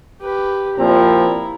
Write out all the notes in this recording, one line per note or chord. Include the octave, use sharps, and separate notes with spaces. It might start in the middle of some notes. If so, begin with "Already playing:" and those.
G4 B4
A#2 F3 C4 E4 A#5